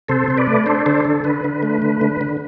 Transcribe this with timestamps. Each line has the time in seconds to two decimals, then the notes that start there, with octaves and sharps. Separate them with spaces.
0.09 C3 A4 C5
0.28 C3 C5
0.38 B4 D5
0.47 A3
0.66 D4 A4 C5
0.86 D3 A4 C5
1.05 D3 A4
1.24 D3 B4
1.44 D3
1.63 A3
1.82 D3
2.01 D3
2.21 D3